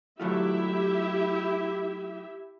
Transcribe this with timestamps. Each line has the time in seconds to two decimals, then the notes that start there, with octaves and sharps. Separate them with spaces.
0.20 F#3 A3 E4 F4 G4 E5